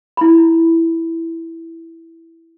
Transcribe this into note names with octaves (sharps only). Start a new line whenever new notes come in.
E4 B5